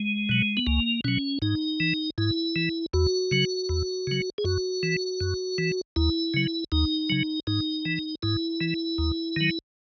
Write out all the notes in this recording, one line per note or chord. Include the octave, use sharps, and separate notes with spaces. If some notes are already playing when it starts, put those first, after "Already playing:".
Already playing: G#3
B2 F#3
B3
C#2 A#3
B2 F#3 C#4
G#2 D#4
E3
G#2 E4
E3
E2 F#4
C#3 F#3
E2
C#3 F#3
G#4
F#2 F#4
E3
F#2
E3
D#2 E4
C#3 F#3
D#2 D#4
C#3 F#3
G#2 D#4
E3
G#2 E4
E3
D#2
D#3 F#3